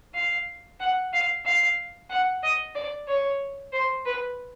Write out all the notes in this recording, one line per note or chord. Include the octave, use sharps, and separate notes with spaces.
F5
F#5
F5
F5
F#5
D#5
D5
C#5
C5
B4